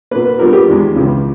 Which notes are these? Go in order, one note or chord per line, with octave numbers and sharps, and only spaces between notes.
B2 A#3 B4
B4
A#2 G3 B3 A#4
G4
E2 D#3 G#3
C#2 C#3 E3